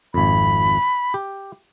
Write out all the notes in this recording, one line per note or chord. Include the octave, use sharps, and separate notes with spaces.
G#1 F2 B5
G4